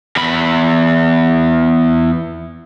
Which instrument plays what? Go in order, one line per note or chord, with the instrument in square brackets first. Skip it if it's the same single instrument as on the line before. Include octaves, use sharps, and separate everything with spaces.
[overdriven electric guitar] E2 B5